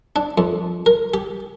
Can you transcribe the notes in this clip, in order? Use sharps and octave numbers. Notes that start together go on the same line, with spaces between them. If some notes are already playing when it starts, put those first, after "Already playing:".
D4
F2
A#4
G4